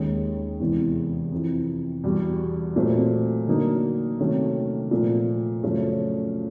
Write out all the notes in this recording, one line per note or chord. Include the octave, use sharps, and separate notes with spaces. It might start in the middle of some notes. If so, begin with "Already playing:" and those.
Already playing: D#2 D#3 G#3 C#4
E2 C3 E3 G#3
F2 C3 E3
E2 B2 G3
A#2 F#3 A3 C4
D3 F#3 A#3 D#4
C3 D#3 F#3 A3 C#4
A#2 F3 A3
F#2 C#3 F3 A3 C#4